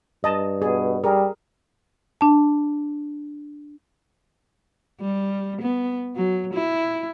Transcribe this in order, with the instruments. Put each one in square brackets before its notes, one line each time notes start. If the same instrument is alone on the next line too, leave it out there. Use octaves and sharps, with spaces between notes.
[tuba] G2 [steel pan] D#5 A5
[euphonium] B2 [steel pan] G#4
[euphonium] G3 [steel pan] G#4 A#4
[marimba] D4 A5
[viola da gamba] G3
B3
F#3
E4